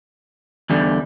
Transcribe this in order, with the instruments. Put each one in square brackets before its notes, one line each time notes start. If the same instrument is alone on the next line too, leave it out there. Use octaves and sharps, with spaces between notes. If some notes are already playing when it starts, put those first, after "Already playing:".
[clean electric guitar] E2 D3 G3